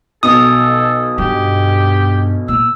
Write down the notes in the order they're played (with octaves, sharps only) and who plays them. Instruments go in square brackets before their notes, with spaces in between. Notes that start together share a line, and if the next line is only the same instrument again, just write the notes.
[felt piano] B1 B2 [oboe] A4 [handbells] D#6
[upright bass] G2 [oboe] G4
[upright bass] A#2 [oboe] E6